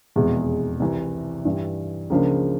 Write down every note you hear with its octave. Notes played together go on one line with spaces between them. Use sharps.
F1 E2 B2 G#3
C2 C3 E3
G2 E3 G3
C#2 C#3 F3 A#3 D4